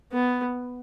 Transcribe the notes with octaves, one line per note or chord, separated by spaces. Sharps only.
B3